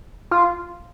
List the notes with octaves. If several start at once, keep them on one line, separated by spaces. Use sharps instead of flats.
F4